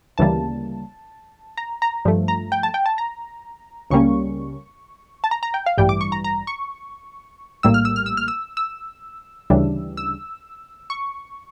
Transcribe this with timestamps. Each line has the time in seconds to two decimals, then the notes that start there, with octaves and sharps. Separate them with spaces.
0.18 D2 C#3 E3 G3 A#3 A5
1.57 A#5
1.82 A#5
2.05 G2 F3 A3
2.28 A#5
2.52 G5
2.63 A5
2.74 G5
2.86 A5
2.98 A#5
3.90 C#2 C#3 G3 A#3 C#4 C#6
5.24 A5
5.31 A#5
5.43 A#5
5.54 G5
5.66 F5
5.77 A1 G2 E3 G3 G5
5.89 D6
6.01 C#6
6.12 A#5
6.24 A#5
6.47 C#6
7.63 A#1 A2 G3 A#3 E6
7.74 F6
7.85 E6
7.96 F6
8.06 E6
8.17 F6
8.28 E6
8.57 E6
9.50 D2 C#3 E3 G3 D4
9.97 E6
10.90 C#6